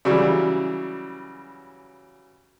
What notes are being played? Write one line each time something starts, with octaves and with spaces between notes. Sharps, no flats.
C#3 E3 F#3 G3